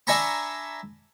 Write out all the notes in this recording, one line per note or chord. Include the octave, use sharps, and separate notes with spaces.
D4 E5 G#5 A#5 B5 C#6